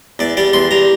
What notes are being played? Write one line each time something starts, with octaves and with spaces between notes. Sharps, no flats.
E2 D5
G3 D5
E2 C6
G3 A#5